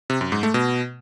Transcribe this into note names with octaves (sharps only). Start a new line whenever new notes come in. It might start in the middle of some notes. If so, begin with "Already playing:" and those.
C3
F#2
G#2
A3
B2